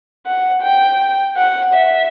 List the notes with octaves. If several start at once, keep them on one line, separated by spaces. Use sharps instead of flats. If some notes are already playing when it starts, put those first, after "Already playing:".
F#5
G5
F#5
E5